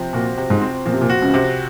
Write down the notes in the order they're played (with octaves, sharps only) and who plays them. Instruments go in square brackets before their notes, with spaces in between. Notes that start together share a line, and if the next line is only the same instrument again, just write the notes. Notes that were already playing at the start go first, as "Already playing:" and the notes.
Already playing: [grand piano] C3 F3 C4
[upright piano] A#2 [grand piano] F#4
[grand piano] C3
[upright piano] G#2
[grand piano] C4
[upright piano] A#2 [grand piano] F3
[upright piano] C3
A#2
[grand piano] F#4
[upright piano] C#2 C#3
[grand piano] C3